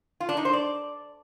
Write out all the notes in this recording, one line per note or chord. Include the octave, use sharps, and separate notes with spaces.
F4
D4
D#4
C5
D5